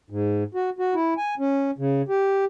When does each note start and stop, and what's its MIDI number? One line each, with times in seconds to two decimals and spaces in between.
0.10 0.44 44
0.54 0.70 66
0.79 0.94 66
0.95 1.14 64
1.17 1.35 80
1.39 1.71 61
1.78 2.02 49
2.09 2.45 67